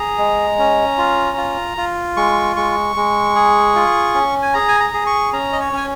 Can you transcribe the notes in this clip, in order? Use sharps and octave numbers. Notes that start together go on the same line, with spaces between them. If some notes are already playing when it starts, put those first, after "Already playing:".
Already playing: G#4 A#5
G#3
C#4
F4
F4
F4
G#3 C#6
G#3 C#6
G#3
G#4
F4
C#4
G#5
G#4 A#5
G#5
A#5
G#4
C#6
C#4 A#5
D#5
C#5
C#4 G#5